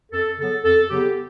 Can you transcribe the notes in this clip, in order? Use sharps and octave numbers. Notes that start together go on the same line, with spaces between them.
F2 A4
C#3 F#3 B3 A4
F2 A4
C#3 F#3 B3 G4